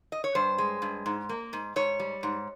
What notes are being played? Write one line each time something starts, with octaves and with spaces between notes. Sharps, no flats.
D#5
C#5
G2 C5
G#3
G2
G#2
A#3
G#2
G#2 C#5
G3
G#2